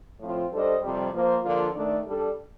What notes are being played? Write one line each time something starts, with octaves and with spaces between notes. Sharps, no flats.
A2 F3 C4 F4
G3 D4 A4 C5 D#5
F2 C3 G3
F3 A#3 F4 C5
D3 F3 A#3 D4 F4
D#3 A3 D4 A4 D5
G3 D4 A4